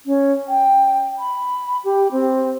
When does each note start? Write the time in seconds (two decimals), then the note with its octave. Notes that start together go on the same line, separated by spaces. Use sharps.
0.06 C#4
0.48 G5
1.18 B5
1.84 G4
2.12 C4